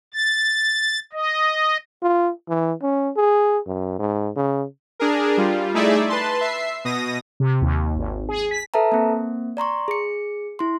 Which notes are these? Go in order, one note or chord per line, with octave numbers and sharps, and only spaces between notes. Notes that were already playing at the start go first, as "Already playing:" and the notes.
A6
D#5
F4
E3
C#4
G#4
F#2
G#2
C#3
D4 G#4 A#4
G3 F4
A3 D#4 E4 G#4 D5 E5
B4 A5 C6
E5 C7
B2 D#6 A#6
C3
D#2
G#1
G#4
B6
A4 B4 E5 A5 A#5
A#3 C4
D5 A#5 C6 C#6
G#4 C#7
E4 C6